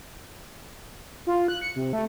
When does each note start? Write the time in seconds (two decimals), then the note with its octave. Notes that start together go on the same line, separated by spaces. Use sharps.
1.27 F4
1.48 F#6
1.61 C#7
1.75 C3
1.93 A3